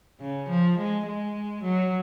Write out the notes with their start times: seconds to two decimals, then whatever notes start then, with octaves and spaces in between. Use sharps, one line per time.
0.21 C#3
0.49 F3
0.78 G#3
1.06 G#3
1.63 F#3